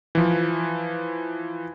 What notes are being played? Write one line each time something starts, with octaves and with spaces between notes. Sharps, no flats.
E3 F3